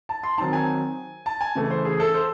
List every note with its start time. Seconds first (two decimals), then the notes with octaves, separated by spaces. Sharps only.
0.09 A5
0.23 C6
0.38 D#3 F#3 C4 D#4 A5
0.53 G#5
1.26 A5
1.41 G#5
1.55 C#3 E3 A3
1.70 C5
1.85 G#4
2.00 A4
2.14 C5